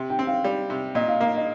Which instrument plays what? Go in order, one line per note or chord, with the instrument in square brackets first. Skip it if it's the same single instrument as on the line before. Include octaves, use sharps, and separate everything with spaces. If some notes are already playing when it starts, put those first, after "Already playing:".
Already playing: [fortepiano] C3
[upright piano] G5
[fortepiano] C4
[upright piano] F5
[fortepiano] G3
C3
[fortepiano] A#2 [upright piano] D#5
[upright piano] F5
[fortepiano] A#3 [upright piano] D#5
[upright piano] D#5